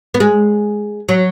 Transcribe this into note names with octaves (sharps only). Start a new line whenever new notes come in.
B3
G#3
F#3